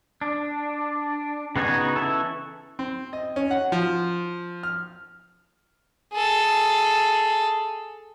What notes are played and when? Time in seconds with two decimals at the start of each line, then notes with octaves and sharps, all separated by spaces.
0.21 D4
1.56 C#3 B3 D#4 F#4 G#5
1.96 E3 C#4 E4 A4 E5
2.79 C4
3.13 D#5
3.36 C#4
3.51 F#5
3.72 F3
4.63 F6
6.13 G#4 A4